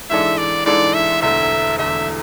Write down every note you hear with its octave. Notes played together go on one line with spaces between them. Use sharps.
G#2 E3 G#3 D4 A4 E5
D5
G#2 E3 G#3 D4 A4 D5
E5
E1 E2 D3 A3 E4 E5
E1 E2 D3 A3 E4 E5